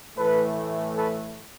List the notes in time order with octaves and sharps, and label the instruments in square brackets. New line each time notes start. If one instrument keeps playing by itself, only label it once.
[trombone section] A2 E3 A3 A4 B4
A4 B4